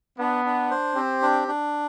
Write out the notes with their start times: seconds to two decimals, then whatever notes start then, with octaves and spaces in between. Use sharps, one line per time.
0.19 B3 D4
0.45 D4
0.71 C5
0.96 C4 G4
1.22 D4
1.48 D4